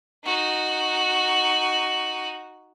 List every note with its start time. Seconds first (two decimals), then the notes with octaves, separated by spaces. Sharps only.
0.24 D#4 F#4